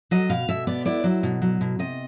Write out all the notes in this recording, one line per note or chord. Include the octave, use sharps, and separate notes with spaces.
F#3 D#5
B2 F5
B2 E5
B3 D5
E4 D5
F#3
B2
F#3
B2
C3 D#5